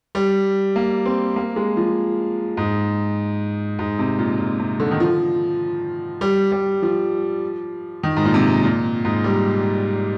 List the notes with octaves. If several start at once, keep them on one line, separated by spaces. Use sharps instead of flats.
G3
A#3
C4
A#3
G#3
F3
G#2
G#2
C3
A#2
A#2
C3
D3
D#3
F3
G3
G3
F3
D#3
G#2
A#2
C3
A#2
G#2
G3